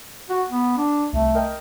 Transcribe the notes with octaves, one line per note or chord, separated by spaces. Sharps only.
F#4
B3
D4
C2 A3
A#4 D#5 G5